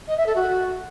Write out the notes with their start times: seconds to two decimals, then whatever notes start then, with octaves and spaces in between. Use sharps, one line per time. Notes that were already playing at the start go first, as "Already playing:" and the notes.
0.08 D#5
0.17 E5
0.26 A4
0.36 F#4